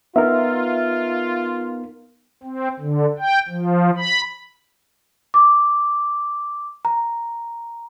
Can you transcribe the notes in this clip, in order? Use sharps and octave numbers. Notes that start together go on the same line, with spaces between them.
B3 D#4 F4 A#4 E5
C4
D3
G5
F3
B5
D6
A#5